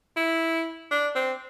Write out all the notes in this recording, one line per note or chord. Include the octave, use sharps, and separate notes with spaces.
E4
D4
C4